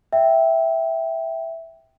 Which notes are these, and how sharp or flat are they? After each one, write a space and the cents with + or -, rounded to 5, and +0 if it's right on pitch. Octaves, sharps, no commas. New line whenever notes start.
E5 +0 G5 +0